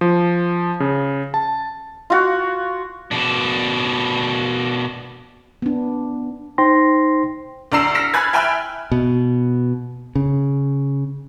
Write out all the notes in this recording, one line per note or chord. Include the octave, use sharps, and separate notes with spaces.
F3
C#3
A5
F4 F#4
B2 D4
B3 D4
D#4 C5 G5 C6 A#6
D2 D4 A#5 E6 C7 E7
F6 A#6 B6 C#7 E7
G#5 B5 F6 F#6 G#6 A6
E5 G5 G#5 B5 F6 F#6
B2
C#3